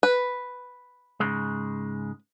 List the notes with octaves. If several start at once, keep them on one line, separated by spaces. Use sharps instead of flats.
B4
G#2 C#3 G#3